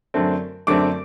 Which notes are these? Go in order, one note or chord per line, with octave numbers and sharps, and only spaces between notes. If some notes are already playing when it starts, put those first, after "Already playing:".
F#2 D3 A3 C4
F#2 D3 A3 C4 D6